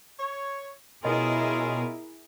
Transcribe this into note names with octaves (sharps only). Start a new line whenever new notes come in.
C#5
B2 C#4 E4 F4 G#4 A#4 D#5